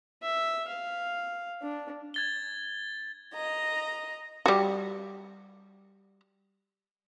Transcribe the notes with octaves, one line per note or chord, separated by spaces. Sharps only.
E5
F5
D4
G#6 A6 G7
D#5 A#5
G3 F#4